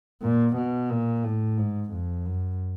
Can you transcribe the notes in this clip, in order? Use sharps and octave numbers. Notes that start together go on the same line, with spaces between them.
A#2
B2
A#2
A2
G#2
F2
F#2